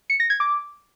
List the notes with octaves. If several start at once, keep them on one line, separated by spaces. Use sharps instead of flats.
C#7
A#6
G#6
D6